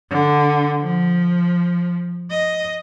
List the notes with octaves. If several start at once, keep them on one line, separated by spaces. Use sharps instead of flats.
D3
F3
D#5